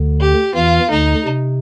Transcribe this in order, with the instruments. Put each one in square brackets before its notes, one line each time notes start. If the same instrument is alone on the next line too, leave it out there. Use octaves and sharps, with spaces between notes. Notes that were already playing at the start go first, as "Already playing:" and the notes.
Already playing: [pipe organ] D2 D3
[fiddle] G4
[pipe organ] E2 E3 [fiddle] F4
[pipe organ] D2 D3 [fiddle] D#4
[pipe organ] C3